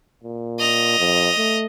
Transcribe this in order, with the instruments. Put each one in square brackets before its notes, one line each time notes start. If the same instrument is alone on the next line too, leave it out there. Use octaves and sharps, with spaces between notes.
[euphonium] A#2
[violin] D#5 F7
[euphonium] F2
A3